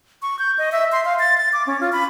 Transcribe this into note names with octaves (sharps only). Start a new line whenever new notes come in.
C#6
G6
D#5
E5
C6
F5
A6
A6
D6
C#4
F4
B5